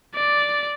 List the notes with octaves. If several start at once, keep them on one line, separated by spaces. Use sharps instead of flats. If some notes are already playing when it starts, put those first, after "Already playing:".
D5